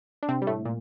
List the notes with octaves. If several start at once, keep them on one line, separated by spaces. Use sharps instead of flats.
D4
C3 C4
G3
A2 A3
A#2